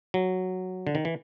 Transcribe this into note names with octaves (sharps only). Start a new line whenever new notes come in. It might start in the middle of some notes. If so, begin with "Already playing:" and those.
F#3
D3
D#3
E3